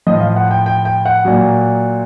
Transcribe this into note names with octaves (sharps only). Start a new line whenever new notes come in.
A2 F3 D#5
F5
F#5
G5
G5
G5
F#5
A#2 F#3